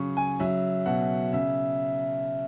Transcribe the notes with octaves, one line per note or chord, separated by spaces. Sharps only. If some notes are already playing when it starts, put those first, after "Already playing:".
Already playing: C#3 F#3 C#6
G#5
F#3 E5
B2 F#5
C#3 E5